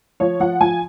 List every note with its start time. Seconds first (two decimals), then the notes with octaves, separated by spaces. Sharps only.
0.20 F3 C#5
0.40 F3 F#5
0.60 F3 G#5